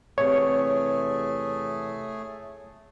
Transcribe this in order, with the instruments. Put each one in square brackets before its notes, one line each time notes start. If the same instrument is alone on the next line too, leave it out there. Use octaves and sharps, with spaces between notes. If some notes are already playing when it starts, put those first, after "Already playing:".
[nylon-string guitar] E2 C3 B3 [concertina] A3 G#4 [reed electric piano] C#5